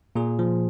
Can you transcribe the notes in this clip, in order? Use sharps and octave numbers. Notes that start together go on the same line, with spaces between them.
A#2 G#4
F3